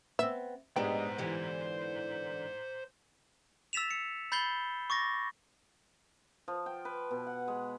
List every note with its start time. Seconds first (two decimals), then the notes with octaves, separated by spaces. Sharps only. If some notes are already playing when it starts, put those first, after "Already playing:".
0.19 B3 C4 E5
0.76 G#2 G#3 B3 D4 G4 C5 G5 A#5
1.18 D3 E3 G4
3.73 E6 A6 B6 E7 F7
3.91 C#7
4.32 B5 G6 A6 C7 G7
4.90 C#6 D6 A6 A#6
6.48 F3
6.66 G5
6.85 B4
7.11 B2
7.27 F#5
7.48 G#3